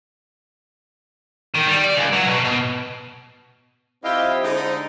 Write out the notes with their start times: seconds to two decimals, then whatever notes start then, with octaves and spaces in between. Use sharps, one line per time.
1.55 D#3
1.67 G3
1.84 D5
1.97 C#2
2.13 F#3
2.26 B2
2.44 B2
4.04 F3 C4 E4 G4 C5 D#5 F5
4.44 D3 G#3 D#4